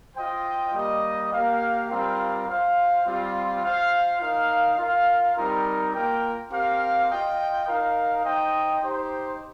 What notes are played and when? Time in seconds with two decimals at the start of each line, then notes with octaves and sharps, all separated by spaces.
0.16 F4 C5 D#5 G5
0.73 G3 A#3 G4 D#5
1.31 A#3 G4 A#4 F5
1.89 G3 C4 F4 A#4 F5
2.47 F4 C5 F5
3.05 G3 C4 F4
3.62 F4 C5 F5
4.20 D#4 A#4 F5
4.78 F4 A#4 F5
5.36 G3 C4 D#4 A#4
5.94 A#3 F4 A#4 G5
6.51 C4 G4 A#4 F5
7.08 F4 D#5 G5
7.67 D#4 A#4 F5
8.24 D#4 C5 D#5 G5
8.82 D#4 G4 C5